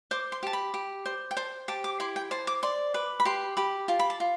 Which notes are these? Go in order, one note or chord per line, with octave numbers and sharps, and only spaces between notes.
C5 D6
C6
G4 A5
B5
G4
C5
G5
C5 A5
G4 A5
D6
E4 C6
G5
C5 A5
D6
D5 C6
B4 D6
B5
G4 C6
G4 B5
F4 A5
B5
A5
F4